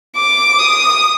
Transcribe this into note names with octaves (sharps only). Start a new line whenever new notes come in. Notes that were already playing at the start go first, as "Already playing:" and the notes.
D6
D#6